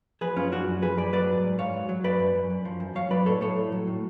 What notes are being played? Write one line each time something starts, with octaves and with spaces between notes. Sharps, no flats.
F3 G#4 B4
F#2 C#4 F4
F3 D4 F#4
F#2
F3 G#4 B4
F#2 B4 D5
F#3 B4 D5
G#2
G#2
G#2 C#5 F5
F#3
F#3
F#2 B4 D5
F#2
F#2
F#2
F3
F#2
F#3 C#5 F5
F#3 B4 D5
A2 A4 C#5
A2 A4 C#5
A2
F#3
A2